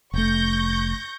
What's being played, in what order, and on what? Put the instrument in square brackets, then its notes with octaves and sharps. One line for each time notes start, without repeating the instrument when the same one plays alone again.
[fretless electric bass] F1 A3 [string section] C#6 G6 A#6